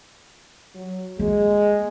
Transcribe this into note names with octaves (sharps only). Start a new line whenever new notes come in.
F#3
G#3 A#3